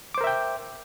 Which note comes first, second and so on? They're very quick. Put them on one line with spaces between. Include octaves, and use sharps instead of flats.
D6 C5 A#4 E5 G5